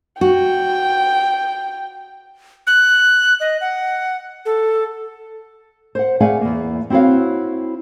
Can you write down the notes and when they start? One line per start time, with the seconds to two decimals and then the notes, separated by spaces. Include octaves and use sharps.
0.21 F#4 G5
2.67 F#6
3.40 D#5
3.61 F#5
4.46 A4
5.95 C5 F#5
6.20 A3 G#4 D5 F5 F#5 G#5
6.41 E2 A#3
6.90 C4 E4 F#4 C#5 F5